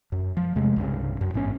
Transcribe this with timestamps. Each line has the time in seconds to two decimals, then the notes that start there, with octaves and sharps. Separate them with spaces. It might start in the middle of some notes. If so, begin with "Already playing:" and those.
0.12 F#2
0.37 F3
0.55 E2 C3 G#3 A3
0.76 C2 G2 C#3
1.21 F#2
1.34 A1 G#2 B2 C#4